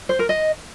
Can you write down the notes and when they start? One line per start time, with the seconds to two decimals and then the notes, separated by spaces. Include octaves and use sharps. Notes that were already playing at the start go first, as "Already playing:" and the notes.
0.09 C5
0.19 A#4
0.29 D#5